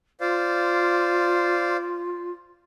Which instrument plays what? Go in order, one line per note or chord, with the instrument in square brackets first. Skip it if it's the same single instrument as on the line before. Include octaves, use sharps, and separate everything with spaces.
[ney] F4 [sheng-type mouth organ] C5 D5 F5